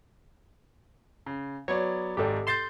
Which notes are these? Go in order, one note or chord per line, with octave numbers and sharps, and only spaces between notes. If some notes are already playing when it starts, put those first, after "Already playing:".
C#3
F#3 B3 C#5 D5
G#1 G#2 G4 A4 D5
C6 G6 A6 C7 E7